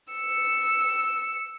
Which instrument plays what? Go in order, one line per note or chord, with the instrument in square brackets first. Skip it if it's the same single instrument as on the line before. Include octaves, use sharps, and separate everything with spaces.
[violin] E6 C#7